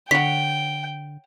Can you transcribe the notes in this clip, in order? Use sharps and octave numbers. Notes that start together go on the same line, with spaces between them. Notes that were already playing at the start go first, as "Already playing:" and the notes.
D3 C#5 F#5 G5 B6